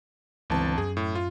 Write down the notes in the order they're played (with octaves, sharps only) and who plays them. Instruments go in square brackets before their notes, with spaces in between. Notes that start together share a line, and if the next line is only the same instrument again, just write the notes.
[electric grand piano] G1 A5 [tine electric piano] C#2 E3 C4
[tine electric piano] F#2 [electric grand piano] G#4
[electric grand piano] A2
F4